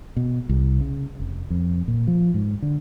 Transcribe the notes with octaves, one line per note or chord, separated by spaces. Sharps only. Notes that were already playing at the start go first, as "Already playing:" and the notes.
B2
C2
C#3
F1
F2
A#2
F3
G#2
D3